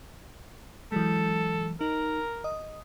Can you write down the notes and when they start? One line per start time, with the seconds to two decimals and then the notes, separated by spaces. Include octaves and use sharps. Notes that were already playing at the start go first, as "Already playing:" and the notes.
0.92 E3 F#3 G#3 A4
1.81 D#4 A#4
2.44 D#5 D#6